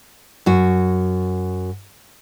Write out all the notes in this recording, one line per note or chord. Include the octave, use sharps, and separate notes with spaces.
F#2 F#4